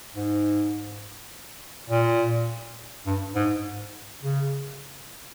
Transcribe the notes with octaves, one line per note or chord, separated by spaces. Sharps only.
G#2
A#2
G2
G#2
C#3